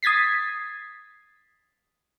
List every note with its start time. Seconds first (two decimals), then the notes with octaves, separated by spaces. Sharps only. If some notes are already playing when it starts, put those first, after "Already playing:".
0.03 D#6 G#6 A6 B6 C7